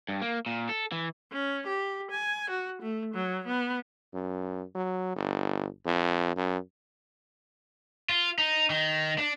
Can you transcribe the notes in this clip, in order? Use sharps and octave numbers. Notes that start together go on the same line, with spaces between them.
G2
A#3
A#2
A4
E3
C#4
G4
G#5
F#4
A3
F#3
B3
F#2
F#3
G1
F2
F#2
F4
D#4
D#3
D4